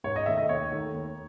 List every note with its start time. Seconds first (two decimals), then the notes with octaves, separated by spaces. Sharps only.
0.04 G#2 C#5
0.16 D#5
0.26 D#3 A3 E5
0.38 D#5
0.49 D#2 C#5
0.72 D#3 A3
0.94 D#2